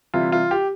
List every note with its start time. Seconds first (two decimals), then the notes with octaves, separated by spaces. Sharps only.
0.14 C3 E3 G3 F4
0.32 F4
0.51 G4